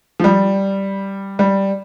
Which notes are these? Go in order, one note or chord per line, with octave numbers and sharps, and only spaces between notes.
F3
G3
G3